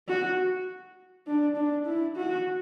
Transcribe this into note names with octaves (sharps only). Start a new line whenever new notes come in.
F#4
D4
D4
E4
F#4